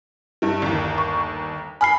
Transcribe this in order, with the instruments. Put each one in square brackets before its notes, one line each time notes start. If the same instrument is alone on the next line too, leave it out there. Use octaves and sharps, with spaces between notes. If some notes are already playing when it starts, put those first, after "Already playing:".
[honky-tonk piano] G2 G3
G1 D#2
[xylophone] C#6
[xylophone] G#5 F6 C7 [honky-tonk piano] B5